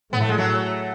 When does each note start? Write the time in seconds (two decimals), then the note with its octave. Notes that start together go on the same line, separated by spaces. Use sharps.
0.12 A2 B3
0.21 A3
0.29 G#3
0.37 F#3 A3